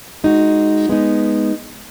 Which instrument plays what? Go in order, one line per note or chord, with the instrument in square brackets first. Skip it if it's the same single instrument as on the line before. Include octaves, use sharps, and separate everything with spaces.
[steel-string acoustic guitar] G#3 D#4 F#4
G#3 B3 D#4